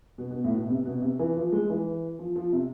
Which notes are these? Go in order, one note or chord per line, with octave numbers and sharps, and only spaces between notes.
B2
B2
A2
B2
C3
B2
C3
E3
F3
G#3
E3
F3
F3
C3